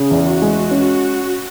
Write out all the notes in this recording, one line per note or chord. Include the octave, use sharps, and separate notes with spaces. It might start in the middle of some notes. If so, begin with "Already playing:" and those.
Already playing: C#3 G#4
E2
F#4
G#3
C#4